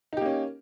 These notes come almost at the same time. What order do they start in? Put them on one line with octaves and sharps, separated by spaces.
D#4 G4 A#3 C#4